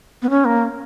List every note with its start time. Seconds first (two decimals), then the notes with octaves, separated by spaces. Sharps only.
0.22 B3
0.30 C#4
0.45 A#3